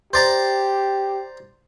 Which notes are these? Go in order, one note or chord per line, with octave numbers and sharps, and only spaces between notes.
G4 C5 D5 A#5